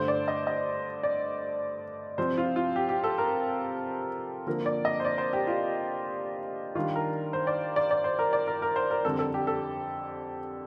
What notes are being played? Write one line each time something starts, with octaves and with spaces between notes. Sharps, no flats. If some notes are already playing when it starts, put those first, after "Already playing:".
Already playing: G2 D3 A3 C5
D5
D#5
D#5
D5
C3 F3 C4 C5
F4
F4
G4
G4
A4
A#4
D3 F3 A#3 A#4
D5
D#5
C5
D5
C5
G4
F4
D#3 G3 D4 F4
A#4
C5
D5
D5
D5
C5
A#4
D5
A#4
A#4
C5
A#4
F2 D3 G3 A4
A4
G4
A4